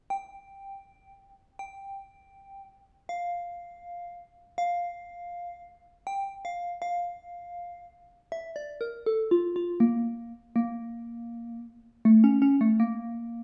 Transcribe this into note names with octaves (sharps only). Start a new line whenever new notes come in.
G5
G5
F5
F5
G5
F5
F5
E5
D5
A#4
A4
F4
F4
A#3
A#3
A3
C#4
C#4
A3
A#3